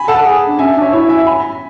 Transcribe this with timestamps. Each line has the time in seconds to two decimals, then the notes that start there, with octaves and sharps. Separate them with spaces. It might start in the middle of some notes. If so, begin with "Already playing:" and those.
Already playing: G#5 B5
0.08 A4 F#5 A5
0.25 G#4
0.48 D4
0.59 C#4 E5 G#5
0.77 D4
0.82 C#5 E5
0.93 E4 C#5 E5
1.09 E5 G#5
1.27 G#5 B5